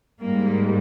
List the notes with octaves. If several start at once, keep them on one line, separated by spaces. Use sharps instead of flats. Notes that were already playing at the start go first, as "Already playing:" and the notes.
G#2 G3 A#3